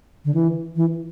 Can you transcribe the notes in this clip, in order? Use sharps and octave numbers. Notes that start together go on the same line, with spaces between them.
D3
E3
E3